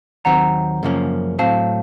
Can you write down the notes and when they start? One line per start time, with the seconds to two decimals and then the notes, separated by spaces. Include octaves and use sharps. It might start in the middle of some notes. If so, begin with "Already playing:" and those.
0.25 D#2 D#3 F#3 C4 F#5 A#5
0.83 F#2 C#3 F3 A#3 C#4
1.39 A2 F#3 C4 F5 A5